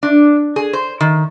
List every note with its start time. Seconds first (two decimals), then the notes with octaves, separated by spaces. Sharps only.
0.03 D4
0.56 G#4
0.73 C5
1.00 D#3